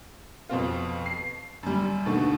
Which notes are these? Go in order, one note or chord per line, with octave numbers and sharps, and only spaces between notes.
F2 B2 C4 F4
C7
F#2 G3
D#2 B2 D3 A3 B3